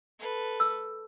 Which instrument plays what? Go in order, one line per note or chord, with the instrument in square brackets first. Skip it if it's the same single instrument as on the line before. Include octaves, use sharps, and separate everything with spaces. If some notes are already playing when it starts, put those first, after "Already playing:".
[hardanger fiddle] A4 B4
[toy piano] E6